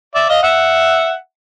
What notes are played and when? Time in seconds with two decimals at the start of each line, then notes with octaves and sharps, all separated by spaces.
0.15 D5 E5
0.29 D#5 F5
0.43 E5 F#5